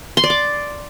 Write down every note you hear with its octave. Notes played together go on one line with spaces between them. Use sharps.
C6
D5
D6